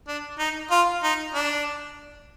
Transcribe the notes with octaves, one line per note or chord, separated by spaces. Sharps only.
D4
D#4
F4
D#4
D4